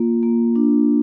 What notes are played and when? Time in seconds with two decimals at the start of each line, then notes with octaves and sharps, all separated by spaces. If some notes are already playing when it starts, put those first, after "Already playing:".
Already playing: A#3 F4
0.23 A#3
0.56 D4